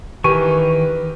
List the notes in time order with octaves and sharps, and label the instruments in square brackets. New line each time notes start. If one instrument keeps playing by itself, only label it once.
[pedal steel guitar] D#3 E3 G#5 [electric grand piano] G4 A#4 [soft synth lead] B4 [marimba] C#6